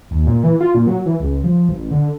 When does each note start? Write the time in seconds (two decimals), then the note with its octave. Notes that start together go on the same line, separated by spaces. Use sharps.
0.11 D#2
0.27 A#2
0.43 E3
0.61 F4
0.75 A#2
0.87 F#3
1.06 E3
1.20 C#2
1.44 F3
1.69 A1
1.91 D3